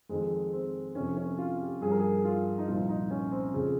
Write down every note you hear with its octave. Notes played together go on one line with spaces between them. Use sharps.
F2 D#3 G#3
C4
F2 C3 F3 C#4
C#4
F4
G4
G2 F3 G#4
A#4
G#4
F4
D#4
C2 A#2 F3 F4
D#4
C#4
C4
F2 C#3 F3